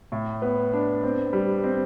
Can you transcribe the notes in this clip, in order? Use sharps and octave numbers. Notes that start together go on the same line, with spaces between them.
A2
B3
D4
C4
G3
C4